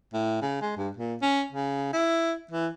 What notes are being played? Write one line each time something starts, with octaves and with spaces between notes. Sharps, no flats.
A2
C#3
G#3
G2
A#2
C#4
C#3
E4
E3